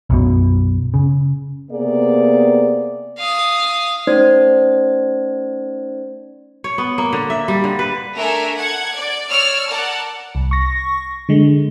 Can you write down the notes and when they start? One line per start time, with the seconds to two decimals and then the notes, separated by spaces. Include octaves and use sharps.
0.10 B1 F#2 B2
0.94 C#3
1.70 C3 A#3 B3 G#4 D5
3.18 F5 D#6
4.07 A3 C#4 D#4 C5 D5 G#6
6.64 C#5
6.78 B3
6.98 A#3
7.13 D3
7.30 E5
7.48 G3
7.64 D3
7.79 B4
8.16 A3 D4 A#4 E5 G#5
8.56 F#5 G#6
8.94 D5
9.30 C#5 D5 E6 F6
9.68 A#4 D5 F#5 A5
10.35 C2
10.51 C#6 A#6
11.29 D3 G#3